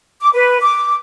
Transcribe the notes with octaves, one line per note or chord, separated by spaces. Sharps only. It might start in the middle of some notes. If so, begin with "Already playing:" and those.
D6
B4
D6